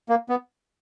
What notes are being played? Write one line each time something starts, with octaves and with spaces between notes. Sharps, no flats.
A#3
B3